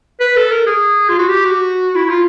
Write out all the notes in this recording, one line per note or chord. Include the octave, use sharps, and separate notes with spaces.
B4
A4
A#4
G#4
F4
F#4
G4
F#4
E4
F4